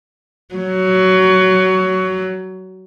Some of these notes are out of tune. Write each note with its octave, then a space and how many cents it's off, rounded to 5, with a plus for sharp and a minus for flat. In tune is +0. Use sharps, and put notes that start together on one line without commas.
F#3 +15